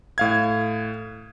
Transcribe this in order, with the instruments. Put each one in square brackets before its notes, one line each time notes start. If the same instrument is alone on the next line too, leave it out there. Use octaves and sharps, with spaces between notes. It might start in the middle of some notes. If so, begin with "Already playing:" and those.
[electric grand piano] A2 F5 G#6